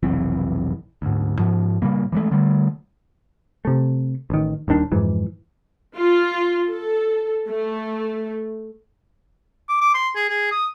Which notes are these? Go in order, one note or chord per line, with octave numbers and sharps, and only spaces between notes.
F1 B1 E3 C4
D2 G#2
G#2 F3
A#2 C#3 G3 A#3
E3 G#3 A3
D3 G3 A3
C3 A3
A1 D#3
D#1 D#2 D#3 D4
F2 G#2 E3
F4
A4
A3
D6
D6
C6
G#4
G#4
D#6